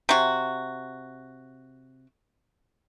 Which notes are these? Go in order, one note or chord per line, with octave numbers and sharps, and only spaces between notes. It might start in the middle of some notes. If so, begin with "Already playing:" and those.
C3 F#4